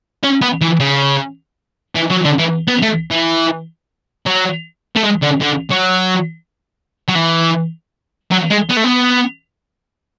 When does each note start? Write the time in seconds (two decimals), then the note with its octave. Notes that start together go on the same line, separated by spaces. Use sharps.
0.23 C#4
0.41 B3
0.61 E3
0.80 C#3
1.95 E3
2.11 F#3
2.25 D3
2.39 E3
2.67 B3
2.82 A3
3.11 E3
4.26 F#3
4.96 A3
5.03 G#3
5.23 D3
5.41 D3
5.70 F#3
7.08 F#3
7.15 E3
8.31 F#3
8.50 G#3
8.69 B3
8.76 A3
8.84 B3